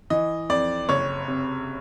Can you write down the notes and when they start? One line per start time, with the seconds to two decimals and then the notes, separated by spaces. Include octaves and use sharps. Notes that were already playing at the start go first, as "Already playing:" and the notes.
0.10 E3 D#5
0.50 F2 D5
0.89 F#1 C#5
1.28 C3